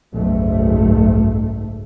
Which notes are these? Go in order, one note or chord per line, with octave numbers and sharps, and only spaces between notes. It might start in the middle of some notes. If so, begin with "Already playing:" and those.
F#1 B1 G#2 A3